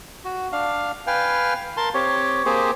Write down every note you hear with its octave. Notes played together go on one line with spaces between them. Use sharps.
F#4
D4 F5
B4 F5 G5 G#5
A#4 A5 C6
C4 G4 C#5
A#3 C4 G4 G#4 C5